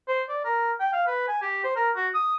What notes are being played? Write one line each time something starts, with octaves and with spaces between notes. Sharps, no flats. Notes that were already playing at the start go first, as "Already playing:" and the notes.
C5
D5
A#4
G5
F5
B4
G#5
G4
C5
A#4
F#4
D#6